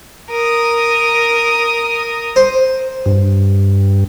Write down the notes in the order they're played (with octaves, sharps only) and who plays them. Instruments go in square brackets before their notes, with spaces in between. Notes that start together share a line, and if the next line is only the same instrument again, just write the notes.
[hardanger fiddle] A#4 D#6
[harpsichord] C5
[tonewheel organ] G2